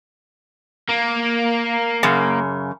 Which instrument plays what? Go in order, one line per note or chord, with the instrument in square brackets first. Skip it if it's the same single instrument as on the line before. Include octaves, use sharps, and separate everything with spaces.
[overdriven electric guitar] A#3
[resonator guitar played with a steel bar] F#2 C#3